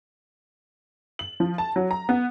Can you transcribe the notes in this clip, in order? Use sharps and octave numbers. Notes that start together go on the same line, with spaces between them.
F#7
F3
A5
F#3
A#5
B3